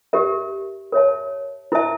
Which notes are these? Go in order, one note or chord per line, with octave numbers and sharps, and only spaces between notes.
G4 A#4 E5
A#4 C#5 E5 A5
E4 A#4 E5 A5